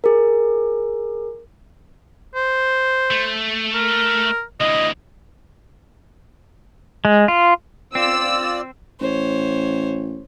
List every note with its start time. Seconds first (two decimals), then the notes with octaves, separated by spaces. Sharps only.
0.04 G#4 A#4
2.35 C5
3.11 A3
3.74 A#4
4.60 D2 E3 D#5
7.05 G#3
7.28 F4
7.95 C4 F4 D5 E6
9.01 A1 C5 C#5